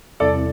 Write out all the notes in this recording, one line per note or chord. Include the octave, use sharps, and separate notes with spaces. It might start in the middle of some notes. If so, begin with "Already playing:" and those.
E2 C3 G3 C4 E4 A4 D5